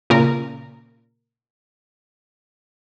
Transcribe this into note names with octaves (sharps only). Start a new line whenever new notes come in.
A#2 C#3 A#4